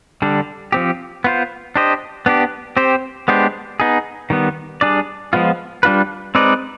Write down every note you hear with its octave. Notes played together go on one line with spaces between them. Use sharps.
D3 G3 D4
F3 C4 G4
B3 F4 C5
D4 G4 C5 D#5
B3 D4 G4
C4 G4 C5
G#3 B3 D4 G4 C5
B3 D#4 G#4
D#3 G3 B3
G3 D4 G#4 D5
F3 G#3 B3 F4
G3 D4 F4 B4
G#3 C4 D#4 B4 D5